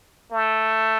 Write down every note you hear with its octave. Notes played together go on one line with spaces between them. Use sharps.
A3